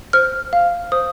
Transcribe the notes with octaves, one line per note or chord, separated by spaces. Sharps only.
C5 F6
F5
C5 D#6